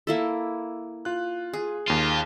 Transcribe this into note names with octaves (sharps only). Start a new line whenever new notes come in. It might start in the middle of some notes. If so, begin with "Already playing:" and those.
A#3 E4 A4
F4 F#6
G#4
D#2 F4 D#7